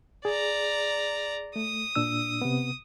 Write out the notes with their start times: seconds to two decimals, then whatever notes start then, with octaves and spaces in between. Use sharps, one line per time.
0.25 G#4 D5 A#5
1.56 A3 D#6
1.95 A#2 D4 E6
2.42 C3 B3